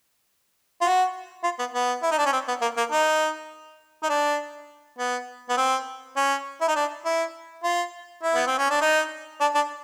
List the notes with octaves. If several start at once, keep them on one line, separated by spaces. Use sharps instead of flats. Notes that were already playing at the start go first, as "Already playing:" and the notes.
F4
F#4
F4
B3
B3
E4
D#4
D4
C#4
C4
B3
A#3
A#3
D#4
D#4
D4
B3
B3
C4
C#4
E4
D#4
D4
E4
F4
E4
B3
C4
C#4
D4
D#4
D4
D4